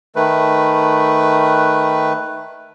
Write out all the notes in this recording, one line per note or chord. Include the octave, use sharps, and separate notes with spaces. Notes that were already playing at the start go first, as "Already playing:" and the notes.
D#3 A3 B4